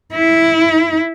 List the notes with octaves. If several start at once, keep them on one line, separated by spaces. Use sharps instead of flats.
E4